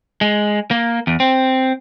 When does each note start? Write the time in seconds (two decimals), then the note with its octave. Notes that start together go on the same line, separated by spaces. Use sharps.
0.21 G#3
0.71 A#3
1.07 E2
1.20 C4